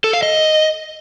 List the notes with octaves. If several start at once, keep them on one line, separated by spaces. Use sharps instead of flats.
A4
F5
D#5